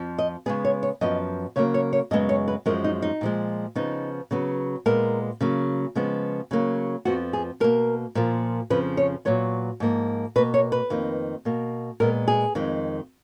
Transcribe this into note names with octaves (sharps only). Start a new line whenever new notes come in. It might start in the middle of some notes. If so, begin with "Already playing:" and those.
Already playing: F2 F3
D#5
C#3 G#3 B3 G#4
C#5
C#5
F#2 F3 B3 D#5
C#3 F#3 A#3 C#5
C#5
C#5
F#2 C#3 G#3 B3 D#5
C#5
B4
F#2 F3 G#3 A#4
D#4
D#4
A#2 F3 G#3
C#3 F3 B3 D#4
C#3 F#3 B3
A#2 G#3 B3 A#4
C#3 F#3 A#3
C#3 F3 G#3 B3
C#3 F#3 A#3
F2 F3 B3 F#4
G#4
B2 A#3 A#4
A#2 F3 A#3
F2 C#3 F3 B4
C#5
A#2 F#3 B3 C#5
G#2 F3 A#3
B2 A#3 B4
C#5
B4
F2 D#3 A#3
B2 A#3
A#2 G#3 B3 A#4
G#4
F2 D#3 G#3